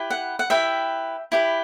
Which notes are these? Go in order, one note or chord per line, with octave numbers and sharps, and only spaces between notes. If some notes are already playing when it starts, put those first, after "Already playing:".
Already playing: E4 G4 B4
F#5
F#5
E4 G4 B4 E5 G5
E4 G4 B4